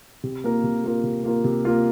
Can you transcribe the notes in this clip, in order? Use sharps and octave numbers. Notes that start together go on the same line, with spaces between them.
C3
A#3 F4 A#4
C3
A#3 F4 A#4
C3
A#3 F4 A#4
C3
A#3 F4 A#4